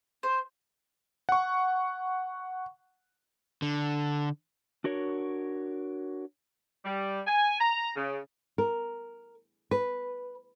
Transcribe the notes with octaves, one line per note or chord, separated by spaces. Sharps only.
C5
F#5 C#6
D3
D4 F#4 A#4 C#5
G3
G#5
A#5
C#3
A#4
B4